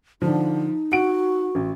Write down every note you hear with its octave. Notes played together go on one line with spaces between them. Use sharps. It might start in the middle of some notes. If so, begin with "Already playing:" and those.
D3 F3 D#4
F#4 F#5 D7
A1